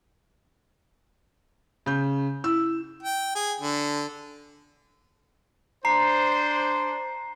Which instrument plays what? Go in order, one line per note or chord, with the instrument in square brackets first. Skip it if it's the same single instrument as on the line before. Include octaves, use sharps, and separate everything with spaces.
[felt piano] C#3 G6
[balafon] E4 [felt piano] E6
[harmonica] G5
G#4
D3
[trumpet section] D4 C5 [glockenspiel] A#5 C7